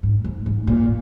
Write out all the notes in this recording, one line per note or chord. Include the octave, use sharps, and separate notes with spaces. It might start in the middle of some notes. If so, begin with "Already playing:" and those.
G#2
G#2
G#2
A#2